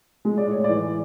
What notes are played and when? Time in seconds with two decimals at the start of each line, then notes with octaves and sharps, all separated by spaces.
0.25 G#3
0.38 D5
0.47 A2 C#5
0.64 E3 D5